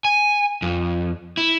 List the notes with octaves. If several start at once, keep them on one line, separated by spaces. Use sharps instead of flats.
G#5
F2
E4